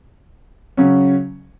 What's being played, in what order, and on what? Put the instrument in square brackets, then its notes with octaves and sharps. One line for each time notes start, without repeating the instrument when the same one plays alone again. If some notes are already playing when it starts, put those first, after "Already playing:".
[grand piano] C#3 F#3 C#4